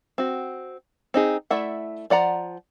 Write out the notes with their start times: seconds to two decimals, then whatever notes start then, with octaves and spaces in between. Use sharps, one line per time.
0.18 C4 F#4
1.14 C4 D#4 G#4
1.50 A3 E4 D5 E5 F#5
2.10 F3 D5 F#5 A#5